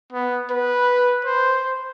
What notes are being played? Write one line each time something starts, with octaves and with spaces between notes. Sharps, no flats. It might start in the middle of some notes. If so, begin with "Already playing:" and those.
B3
B4
C5